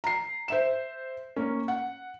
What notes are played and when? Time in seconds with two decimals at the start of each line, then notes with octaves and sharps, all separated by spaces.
0.04 A#5 C7
0.48 C5 E5 E7
1.36 A#3 C#4
1.68 F#5